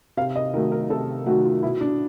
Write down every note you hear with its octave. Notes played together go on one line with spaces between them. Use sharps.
C3 F5
D#5
D#3 F#3 A3 A#4
A#4
C3 A4
D#3 F#3 A3 F#4
F4
B2 E4
D4